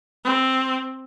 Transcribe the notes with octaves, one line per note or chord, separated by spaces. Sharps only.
C4